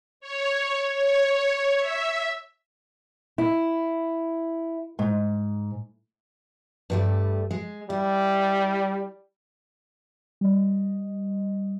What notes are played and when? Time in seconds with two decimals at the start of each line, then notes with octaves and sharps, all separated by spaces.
0.20 C#5
0.94 C#5
1.78 E5
3.38 E4
4.99 G#2
6.90 G2 G3 A3
7.51 G#3
7.90 G3 E4
10.41 G3 D#5